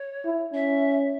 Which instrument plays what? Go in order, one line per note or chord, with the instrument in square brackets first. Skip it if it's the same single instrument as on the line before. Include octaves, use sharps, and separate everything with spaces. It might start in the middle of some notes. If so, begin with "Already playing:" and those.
Already playing: [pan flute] C#5
[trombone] E4
[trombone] C#4 [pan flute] E5